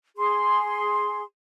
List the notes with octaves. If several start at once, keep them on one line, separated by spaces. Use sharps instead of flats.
G#4 C6